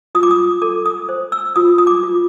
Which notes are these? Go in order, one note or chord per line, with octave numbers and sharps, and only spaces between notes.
F4 D#6
D6
D#6
A4 D6
D#6
C5
E6
F4 D#6
D#6
D6
F4